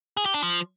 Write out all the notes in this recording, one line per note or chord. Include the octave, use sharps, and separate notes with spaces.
G#4
G4
D4
F3